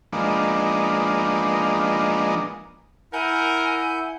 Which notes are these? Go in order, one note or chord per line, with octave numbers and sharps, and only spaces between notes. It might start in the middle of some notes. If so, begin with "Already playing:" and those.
F3 G#3 A#3 B3 D4 D#4
E4 A#4 F#5 G#5 G6